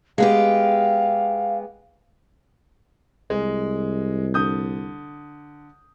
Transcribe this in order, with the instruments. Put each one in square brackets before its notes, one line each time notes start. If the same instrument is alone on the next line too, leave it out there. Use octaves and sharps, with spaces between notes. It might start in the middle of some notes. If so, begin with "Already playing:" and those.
[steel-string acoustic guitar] G#3 B3 G4 [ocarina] F5
[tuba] C2 [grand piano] G#3
[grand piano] D3 D#6 G6